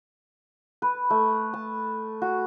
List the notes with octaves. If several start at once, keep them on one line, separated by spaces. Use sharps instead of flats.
B4
A3
A5
F#4